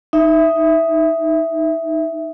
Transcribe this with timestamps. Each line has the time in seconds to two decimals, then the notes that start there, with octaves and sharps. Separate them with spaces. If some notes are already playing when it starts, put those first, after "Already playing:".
0.13 D#4 E5